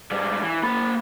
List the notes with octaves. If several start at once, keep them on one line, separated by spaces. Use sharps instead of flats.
G#2 G3
E3
A#3 B5